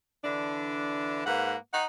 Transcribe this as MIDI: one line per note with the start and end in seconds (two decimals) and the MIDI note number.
0.24 1.22 50
0.24 1.22 52
0.24 1.22 62
1.26 1.54 44
1.26 1.54 58
1.26 1.54 71
1.26 1.54 78
1.73 1.86 63
1.73 1.86 78